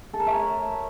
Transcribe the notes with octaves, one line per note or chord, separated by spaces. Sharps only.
A4
A#4
E5
C#5